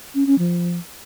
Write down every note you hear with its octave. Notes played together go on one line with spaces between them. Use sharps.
C#4
C#4
F3